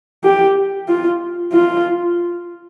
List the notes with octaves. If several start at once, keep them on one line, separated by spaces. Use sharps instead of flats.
G4
F4
F4